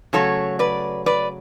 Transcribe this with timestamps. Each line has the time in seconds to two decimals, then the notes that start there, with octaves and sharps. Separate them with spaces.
0.13 C#3 F#3 A3 A4 C#5
0.59 B4 D5
1.06 B4 D5